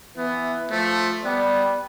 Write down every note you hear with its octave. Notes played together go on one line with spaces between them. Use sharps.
E3 B3
F3 A3
G3 B3